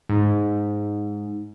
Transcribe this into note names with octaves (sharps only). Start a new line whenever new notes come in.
G#2